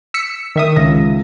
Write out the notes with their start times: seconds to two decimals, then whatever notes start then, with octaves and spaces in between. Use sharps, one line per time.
0.14 E6 B6 C#7
0.56 D#3 E5 D#6
0.76 C#2 A#6